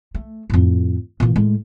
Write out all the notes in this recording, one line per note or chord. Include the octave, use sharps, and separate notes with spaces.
A3
F2 A2
A#2 E3
A2 G#3